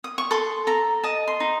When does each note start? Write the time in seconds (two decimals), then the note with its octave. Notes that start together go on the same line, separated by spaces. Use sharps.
0.04 D#6
0.18 C#6
0.31 A4 C6
0.67 A4 A#5
1.04 D#5 A5
1.28 C6
1.40 D#4